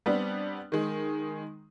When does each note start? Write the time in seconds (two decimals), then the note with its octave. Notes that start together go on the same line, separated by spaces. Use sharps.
0.06 G3 B3 C4 D4
0.72 D#3 G#3